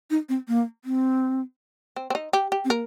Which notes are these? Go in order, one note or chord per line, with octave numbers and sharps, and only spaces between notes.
D#4
C4
A#3
C4
C4
C4
D#4
G4
G4
C4
A#3 A#4